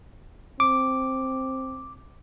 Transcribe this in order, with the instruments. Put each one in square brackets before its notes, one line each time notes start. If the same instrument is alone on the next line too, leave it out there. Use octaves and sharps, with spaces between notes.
[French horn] C4 [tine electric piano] D6